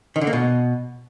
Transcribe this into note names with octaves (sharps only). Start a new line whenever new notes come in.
D#3
D3
A#3
B2